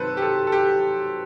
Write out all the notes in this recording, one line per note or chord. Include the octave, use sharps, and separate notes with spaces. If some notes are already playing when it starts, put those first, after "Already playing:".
Already playing: C3 D#3 F#3 A4 B4 C5
G4
A4
A4
G4